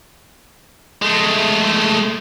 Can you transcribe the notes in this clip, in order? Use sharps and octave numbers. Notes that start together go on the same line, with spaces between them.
G#3 A3